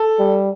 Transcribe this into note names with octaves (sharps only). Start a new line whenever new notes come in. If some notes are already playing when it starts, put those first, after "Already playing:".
Already playing: A4
G3